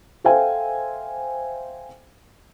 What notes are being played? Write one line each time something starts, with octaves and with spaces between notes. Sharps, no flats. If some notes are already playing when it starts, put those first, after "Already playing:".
A4 C5 E5 F5 G5 G#5